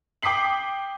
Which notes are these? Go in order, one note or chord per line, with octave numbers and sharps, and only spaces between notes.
G5 D6 D#6 B6 C7 F#7